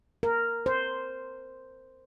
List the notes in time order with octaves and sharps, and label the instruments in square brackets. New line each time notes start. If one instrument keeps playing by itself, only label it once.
[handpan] A#4
C5